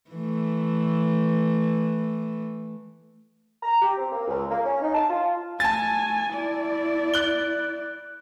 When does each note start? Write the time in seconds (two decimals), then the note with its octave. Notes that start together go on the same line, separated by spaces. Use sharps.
0.11 E3 A3
3.63 A#5
3.82 G4
3.97 C4
4.12 A#3
4.28 C#2
4.51 A#3
4.65 C#4
4.82 D#4
4.94 A5
5.10 F4
5.60 A3 G#5 A5 A6
6.32 E4 D5
7.14 F#6 G7